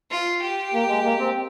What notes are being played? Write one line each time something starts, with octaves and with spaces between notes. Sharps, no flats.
F4
G4
A#3
G#3
A#3
C4